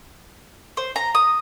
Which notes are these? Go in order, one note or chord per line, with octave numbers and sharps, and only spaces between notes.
C5
A#5
D#6